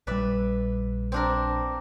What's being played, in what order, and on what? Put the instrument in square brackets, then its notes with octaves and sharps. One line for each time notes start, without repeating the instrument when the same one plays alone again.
[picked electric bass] A#1 G3 [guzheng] B4 D5 E5
[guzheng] C4 D4 A#4